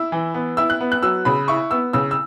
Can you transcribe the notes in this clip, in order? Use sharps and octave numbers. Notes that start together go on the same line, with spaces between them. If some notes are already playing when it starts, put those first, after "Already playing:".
Already playing: E4 E6
E3
B3
E4 E6
F#6
B3
F#6
F#3 E6
C#3 B5
E4 C#6
B3 E6
C#3 E6
E6